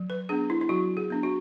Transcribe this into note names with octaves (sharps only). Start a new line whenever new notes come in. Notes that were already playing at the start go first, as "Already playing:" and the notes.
Already playing: F#3
B4
B3 D4 G#4
E4
E4
F#3 F#4
G#4
B3 D4
F#4